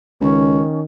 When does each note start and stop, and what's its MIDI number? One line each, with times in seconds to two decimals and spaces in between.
0.21 0.62 37
0.21 0.84 51
0.21 0.81 61